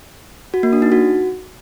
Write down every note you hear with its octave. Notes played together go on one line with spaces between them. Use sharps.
F#4
A#3
D4
D#4
F#4